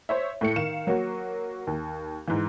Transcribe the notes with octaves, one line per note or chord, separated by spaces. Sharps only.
C5 C#5 E5
A2 A3 C#7
D#3 F5 E7
F#3 A#3 F#4
D#2
G#2 E3